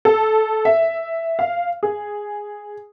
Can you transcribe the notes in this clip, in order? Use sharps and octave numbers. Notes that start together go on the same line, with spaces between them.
A4
E5
F5
G#4